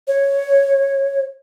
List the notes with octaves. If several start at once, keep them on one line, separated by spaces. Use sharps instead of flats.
C#5